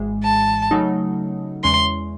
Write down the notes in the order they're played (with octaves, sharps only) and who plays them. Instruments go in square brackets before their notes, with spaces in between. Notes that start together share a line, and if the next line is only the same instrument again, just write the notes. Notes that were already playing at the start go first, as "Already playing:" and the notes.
Already playing: [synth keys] G#1 G#2 E3 G#3
[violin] A5
[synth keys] C#3 F#3 A3 D#4
[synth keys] E2 C#3 E3 G#3 C#4 [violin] C6